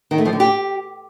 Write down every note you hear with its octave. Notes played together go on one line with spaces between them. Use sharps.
D#3
A3
F3
D3
G4